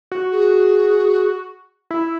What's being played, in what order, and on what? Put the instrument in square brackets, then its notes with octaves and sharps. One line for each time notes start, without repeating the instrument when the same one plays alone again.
[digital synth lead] F#4
[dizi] G#4
[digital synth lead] E4